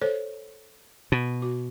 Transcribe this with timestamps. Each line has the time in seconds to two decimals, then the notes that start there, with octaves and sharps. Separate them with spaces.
0.02 A4 C5 C#5
1.12 B2
1.42 F#4